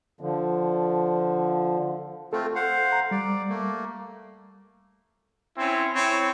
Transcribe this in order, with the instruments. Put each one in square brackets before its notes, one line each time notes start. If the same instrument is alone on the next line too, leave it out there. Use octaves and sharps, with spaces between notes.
[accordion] D3 F3
[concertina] A3 C4 F4 [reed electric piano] A4
[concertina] C5 F5 F#5
[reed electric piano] A#5
[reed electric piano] G3 [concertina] D5
[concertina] A3 A#3
[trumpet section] C4 C#4 E4
C4 E4 C#5